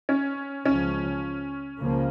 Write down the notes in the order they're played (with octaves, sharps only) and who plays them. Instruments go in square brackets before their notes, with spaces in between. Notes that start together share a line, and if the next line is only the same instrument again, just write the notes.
[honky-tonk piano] C#4
[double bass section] C#2 C#3 F3 [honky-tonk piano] C#4
[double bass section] C#2 C#3 F3 A#3